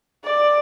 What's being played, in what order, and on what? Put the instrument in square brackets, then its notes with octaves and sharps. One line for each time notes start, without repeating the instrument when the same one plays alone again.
[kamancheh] D5